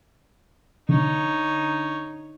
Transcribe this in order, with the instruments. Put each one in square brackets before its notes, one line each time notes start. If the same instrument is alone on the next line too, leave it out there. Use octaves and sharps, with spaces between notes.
[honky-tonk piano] D3 [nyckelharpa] D#4 C#5